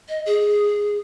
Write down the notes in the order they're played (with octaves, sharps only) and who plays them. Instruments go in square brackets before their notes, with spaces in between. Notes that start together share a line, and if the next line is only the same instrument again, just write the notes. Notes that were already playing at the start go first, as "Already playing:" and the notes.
[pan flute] D#5
G#4